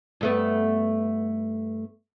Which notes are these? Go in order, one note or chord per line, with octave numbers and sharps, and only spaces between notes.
G2 A3 B3